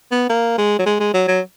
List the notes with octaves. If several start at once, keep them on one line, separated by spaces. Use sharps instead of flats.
B3
A#3
G#3
F#3
G#3
G#3
F#3
F#3